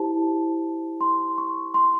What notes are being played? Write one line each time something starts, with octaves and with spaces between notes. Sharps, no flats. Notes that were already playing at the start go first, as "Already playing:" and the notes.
Already playing: E4 G4 C5 A5
C6
C#6
C6